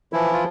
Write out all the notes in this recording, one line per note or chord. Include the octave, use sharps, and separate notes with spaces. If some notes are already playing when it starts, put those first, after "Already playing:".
E3 F3 E4
F4